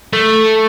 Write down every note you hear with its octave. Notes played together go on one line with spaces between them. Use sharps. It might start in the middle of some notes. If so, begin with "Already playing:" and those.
A3